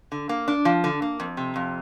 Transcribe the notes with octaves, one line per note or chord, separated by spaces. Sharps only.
D3
A#3
D4
F3
D3
A#3
F2
C3
F2